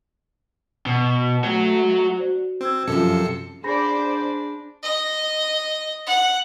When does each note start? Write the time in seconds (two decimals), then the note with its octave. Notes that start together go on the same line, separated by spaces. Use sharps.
0.86 B2
1.44 A3 F#4 C#5
2.17 F#4 C5 D5
2.61 C4 C6 E6 G#6
2.88 F#2 C3 F3 A4 C#7
3.64 D4 G#4 C5 D5 B5 A#6
4.83 D#5
6.06 F#5